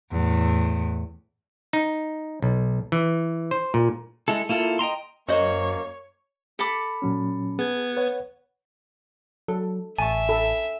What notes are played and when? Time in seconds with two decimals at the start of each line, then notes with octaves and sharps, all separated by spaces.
0.11 E2 A2
1.73 D#4
2.42 B1
2.92 E3
3.51 C5
3.74 A#2
4.28 G#3 E4 A4
4.49 A#3 E4 F4 A4
4.79 D#5 G5 A#5 C6
5.28 F#2 A#3 F#4 C5 C#5 D#5
6.59 A4 B5 D6
7.02 A#2 F#3 C#4
7.59 B3 G#4 G#6
7.97 B4 C#5 F#5
9.48 F#3 A4
9.99 A1 E5 G#5 A5 C#6
10.29 A4 B5